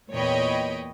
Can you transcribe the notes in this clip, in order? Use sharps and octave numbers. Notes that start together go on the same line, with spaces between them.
E2 A#2 C#5 D#5 G5 B5